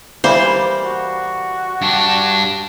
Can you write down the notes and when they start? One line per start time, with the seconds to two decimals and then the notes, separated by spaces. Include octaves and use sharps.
0.24 E3 G3 A#3 C5
0.85 F#4
1.82 G2 D4